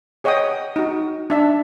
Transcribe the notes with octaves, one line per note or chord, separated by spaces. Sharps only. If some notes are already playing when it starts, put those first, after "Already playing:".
G#4 C#5 D#5 F#5 G5 D#6
D#4 F#4
D4 E5 A5